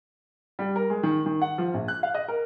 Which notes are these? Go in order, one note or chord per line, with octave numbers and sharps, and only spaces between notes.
G3
A#4
G#3
D#3
D#3
F#5
F3
A#1
F#6
F5
D#5
A#4